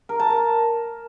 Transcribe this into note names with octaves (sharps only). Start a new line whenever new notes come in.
A#4
A5
A#4